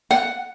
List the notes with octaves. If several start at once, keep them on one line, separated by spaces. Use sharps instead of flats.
F#5